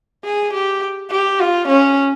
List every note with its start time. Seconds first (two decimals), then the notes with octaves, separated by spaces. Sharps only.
0.25 G#4
0.53 G4
1.11 G4
1.40 F4
1.68 C#4